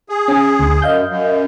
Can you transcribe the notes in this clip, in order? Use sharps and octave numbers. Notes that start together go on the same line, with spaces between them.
G#4
C#4 G#5
D2
F#2 D#5 F5 G6
F#2